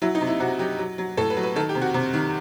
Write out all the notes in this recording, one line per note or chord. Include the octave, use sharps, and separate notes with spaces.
F#3 E4
D#4
C3
E4
C3 F#4
F#3 G4
F#3
F#3
A2 A4
B4
F#3
B4
D#3 A4
G4
C3
F#4
C3
D#3